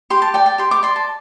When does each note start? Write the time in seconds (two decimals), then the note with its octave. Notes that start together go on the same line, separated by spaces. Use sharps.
0.10 G4 C6
0.22 A5
0.34 D5 G5
0.46 G5
0.58 G4 C6
0.71 D6
0.83 D5 C6
0.96 A5